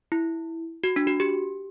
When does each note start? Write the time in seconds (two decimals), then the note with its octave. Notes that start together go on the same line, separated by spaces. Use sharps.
0.12 E4
0.84 F#4
0.96 D4
1.07 F#4
1.20 G4